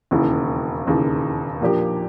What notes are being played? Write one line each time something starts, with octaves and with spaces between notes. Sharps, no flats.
E1 D#2 C#3 E3
E1 D#2 C#3 E3
A#2 F3 A#3 D4 G4